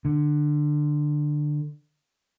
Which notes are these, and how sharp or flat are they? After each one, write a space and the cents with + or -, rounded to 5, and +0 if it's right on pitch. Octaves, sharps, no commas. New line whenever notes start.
D3 +15